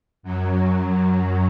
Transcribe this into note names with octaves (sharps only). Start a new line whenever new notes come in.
F#2 F#3
F#2 F#3